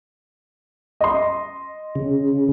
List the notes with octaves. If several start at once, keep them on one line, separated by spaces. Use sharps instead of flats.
D#5 C6
C#3